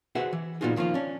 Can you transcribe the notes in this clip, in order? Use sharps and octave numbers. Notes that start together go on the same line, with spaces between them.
F#4 G#4 B4 C5 E5 F#5
E3
A#2 B3 D#4 F4 F#4 G#4
D#3 F3 A#3 C#4 F4
C#4 D4